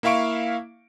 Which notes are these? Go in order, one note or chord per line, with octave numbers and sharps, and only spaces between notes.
A#3 E4 E5 F5 C#6 D7